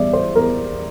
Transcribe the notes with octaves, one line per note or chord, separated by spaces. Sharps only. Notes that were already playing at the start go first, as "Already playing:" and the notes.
Already playing: E2 G3 D5 E5
C5
E2 A#4